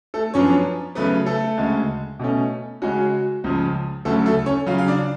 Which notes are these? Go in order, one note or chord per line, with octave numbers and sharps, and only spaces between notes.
A3 A4
F#2 F3 B3 C#4 D4 C#5
C#3 F#3 A3 B3 B4
A3 A4
D2 C#3 G#3
B2 A3 C#4
C#3 G#3 C#4 F#4
C#2 C#3 F3
D2 C#3 F#3 A3 A4
A3 A4
C#4 C#5
C#3 F#3 C#4 F4 F5
F5
D4 D5